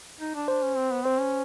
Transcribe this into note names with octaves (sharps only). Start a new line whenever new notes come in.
D#4
D4
D4 C5
C#4
C4
B3
C4 C5
C#4